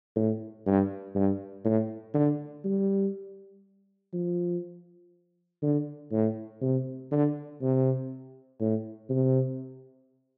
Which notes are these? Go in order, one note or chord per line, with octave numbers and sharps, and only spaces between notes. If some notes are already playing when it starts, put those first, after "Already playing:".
A2
G2
G2
A2
D3
G3
F3
D3
A2
C3
D3
C3
A2
C3